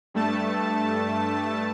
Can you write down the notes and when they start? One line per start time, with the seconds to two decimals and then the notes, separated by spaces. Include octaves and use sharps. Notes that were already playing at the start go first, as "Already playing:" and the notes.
0.14 G2 A3 A5